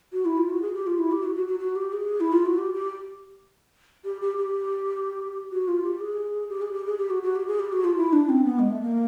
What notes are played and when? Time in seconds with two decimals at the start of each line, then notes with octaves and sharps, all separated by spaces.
0.12 F#4
0.25 E4
0.37 F4
0.49 F#4
0.61 G#4
0.74 G4
0.86 F4
0.99 E4
1.11 G4
1.23 F#4
1.35 F#4
1.47 F#4
1.59 F#4
1.75 G4
1.92 G#4
2.20 E4
2.32 F4
2.45 F#4
2.58 G4
2.74 G4
4.04 G4
4.21 G4
4.37 G4
5.52 F#4
5.68 F4
5.83 G4
6.00 G#4
6.49 G4
6.61 G#4
6.73 G4
6.86 G#4
6.98 G4
7.10 F#4
7.22 F#4
7.35 G4
7.47 G#4
7.59 G4
7.72 F#4
7.84 F4
7.96 E4
8.12 D4
8.29 C4
8.44 B3
8.59 G#3
8.69 A3
8.82 A#3